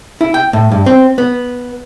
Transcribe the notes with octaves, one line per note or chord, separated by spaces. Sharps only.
E4
G5
A2
G2
C4
B3